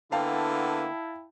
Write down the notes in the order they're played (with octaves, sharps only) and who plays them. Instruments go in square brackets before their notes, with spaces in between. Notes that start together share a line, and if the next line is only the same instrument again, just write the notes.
[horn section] D3 A#3 B3 [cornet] E4 [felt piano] F5 G5 A5